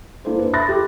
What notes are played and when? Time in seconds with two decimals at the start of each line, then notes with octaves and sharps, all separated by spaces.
0.25 A#3 D4 E4 A4 C5
0.39 B4
0.53 E5 B5 C6 F#6 A6 A#6
0.66 G4 A4